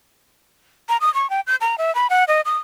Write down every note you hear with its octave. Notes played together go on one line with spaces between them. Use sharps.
A#5
D#6
C#6
G5
G6
A#5
E5
B5
F#5
D#5
D#6